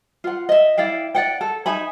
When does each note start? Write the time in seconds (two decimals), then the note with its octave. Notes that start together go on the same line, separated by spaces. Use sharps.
0.24 F4 F#5
0.49 D#5 E5
0.77 E4 D5 F5 G5
1.15 D5 F#5 G5
1.41 A4
1.66 D#4 E5 G#5 B5